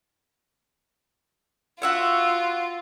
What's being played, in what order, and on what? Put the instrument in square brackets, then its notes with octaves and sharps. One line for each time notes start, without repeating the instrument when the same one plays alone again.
[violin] F4 [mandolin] F#4 E5 F#5